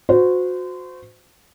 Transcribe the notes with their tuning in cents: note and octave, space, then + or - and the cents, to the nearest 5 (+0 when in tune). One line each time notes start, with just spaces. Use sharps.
F#4 -25 C5 -30